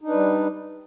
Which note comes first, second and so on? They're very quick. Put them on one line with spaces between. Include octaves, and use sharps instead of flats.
D#4 D4 B4 G3